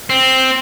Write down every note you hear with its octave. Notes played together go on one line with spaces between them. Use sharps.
C4